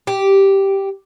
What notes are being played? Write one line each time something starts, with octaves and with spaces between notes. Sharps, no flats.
G4